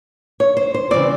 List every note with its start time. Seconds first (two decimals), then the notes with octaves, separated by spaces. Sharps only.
0.40 C#5
0.57 C5
0.74 C5
0.91 C#3 E3 G3 C4 D5